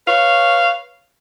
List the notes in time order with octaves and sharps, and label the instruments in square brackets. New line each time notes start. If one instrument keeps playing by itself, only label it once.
[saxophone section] B4 C#5 F5